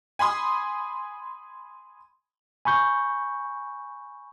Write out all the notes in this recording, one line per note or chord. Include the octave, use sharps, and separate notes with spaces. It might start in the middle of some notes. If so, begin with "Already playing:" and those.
G#5 B5 C6 D#6
G#5 B5 C#6 G6